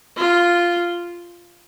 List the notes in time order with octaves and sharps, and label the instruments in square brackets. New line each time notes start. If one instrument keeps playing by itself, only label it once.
[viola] F4